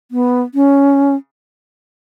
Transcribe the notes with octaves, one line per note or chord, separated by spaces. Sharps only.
B3
C#4